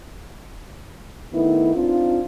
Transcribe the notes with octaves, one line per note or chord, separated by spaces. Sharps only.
D#3 A3 B3 E4
C4 D4 D#4 F4